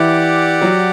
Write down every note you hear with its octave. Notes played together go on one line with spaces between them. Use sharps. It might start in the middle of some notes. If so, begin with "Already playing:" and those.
Already playing: E3 E4 G4 D5 F#5
F#3 F#4